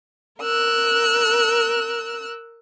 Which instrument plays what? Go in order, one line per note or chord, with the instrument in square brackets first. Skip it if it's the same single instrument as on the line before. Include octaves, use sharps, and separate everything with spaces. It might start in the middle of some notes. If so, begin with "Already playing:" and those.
[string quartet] A#4 E6 F#6